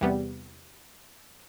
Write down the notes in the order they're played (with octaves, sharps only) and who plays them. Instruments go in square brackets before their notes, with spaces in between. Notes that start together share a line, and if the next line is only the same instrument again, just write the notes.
[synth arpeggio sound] E2 C3 G3 B3